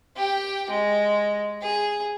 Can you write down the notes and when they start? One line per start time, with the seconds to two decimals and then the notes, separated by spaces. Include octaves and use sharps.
0.16 G4 G5
0.69 G#3
1.62 G#4